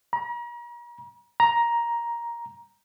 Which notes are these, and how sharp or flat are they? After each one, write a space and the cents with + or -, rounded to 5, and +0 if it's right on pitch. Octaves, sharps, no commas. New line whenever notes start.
A#5 +40
A#5 +10